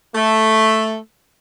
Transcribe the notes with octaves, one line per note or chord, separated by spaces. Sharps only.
A3